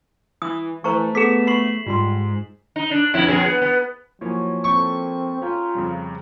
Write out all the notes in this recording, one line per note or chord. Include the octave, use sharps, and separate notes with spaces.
E3 D#6
E3 A3 C5 A#5 C#6
B3 G#4 A4 D6 B6 E7
B5 C#6 C7 F#7
G#2 G3 F4 C6
D#4
D4
F2 B2 E4
F2 A#2 G#4
B3
B3
F3 F#3 A#3 E4 C#5 G#5
C4 A4 E5 G5 C#6
C#4 F4 G#4 G5 A#5
F2 C#3 G3